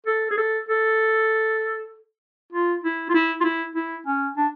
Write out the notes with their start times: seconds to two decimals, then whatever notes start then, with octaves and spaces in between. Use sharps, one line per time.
0.07 A4
0.31 G#4
0.38 A4
0.69 A4
2.52 F4
2.84 E4
3.09 F4
3.14 E4
3.41 F4
3.44 E4
3.75 E4
4.06 C#4
4.37 D4